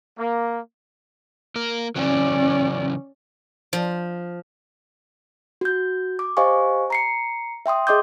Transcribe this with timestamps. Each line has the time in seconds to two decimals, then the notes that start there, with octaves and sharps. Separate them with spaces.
0.18 A#3
1.56 A#3 A#4
1.96 C#3 E3 F#3 C#4 D5
3.73 F3
5.61 F#4 G6
6.19 D6
6.37 G4 C5 D#5 F5 G#5 C#6
6.90 A#5 C7 C#7
7.66 E5 G5 C6 D#6
7.87 G#4 D#5 C6 D6 D#6 G6